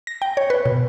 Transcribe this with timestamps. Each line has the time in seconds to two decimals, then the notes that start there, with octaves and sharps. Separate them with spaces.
0.07 A#6
0.22 G5
0.37 C#5
0.50 B4
0.65 B2